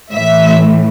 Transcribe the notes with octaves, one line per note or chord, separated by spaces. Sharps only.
A2 E3 E5